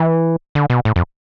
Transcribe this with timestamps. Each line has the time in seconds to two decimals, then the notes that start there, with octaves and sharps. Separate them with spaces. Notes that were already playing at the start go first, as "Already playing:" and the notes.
Already playing: E3
0.55 D3
0.70 B2
0.85 A2
0.96 F2